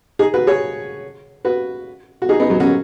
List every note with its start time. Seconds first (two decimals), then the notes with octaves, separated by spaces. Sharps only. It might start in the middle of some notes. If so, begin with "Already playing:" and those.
0.19 D#4 G#4
0.34 F#4 B4
0.47 G#4 C#5
1.45 F#4 B4
2.22 F#4
2.29 D#4 G#4
2.40 B3 D#4
2.50 F#3 B3
2.60 C#4 F#4